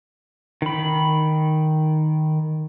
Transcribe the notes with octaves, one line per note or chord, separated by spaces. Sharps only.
D#3 B5